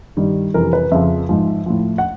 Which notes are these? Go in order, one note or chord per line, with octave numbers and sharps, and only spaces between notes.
G2 D#3 G3
F2 C3 E3 A#4
B4
F2 C#3 F3 E5
G#2 F3
A2 F3
F#5